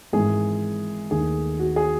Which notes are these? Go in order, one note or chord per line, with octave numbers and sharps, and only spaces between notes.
G#1 G#2 E3 G#3 G#4
D#2 D#3 A3 G#4
F#4
G#4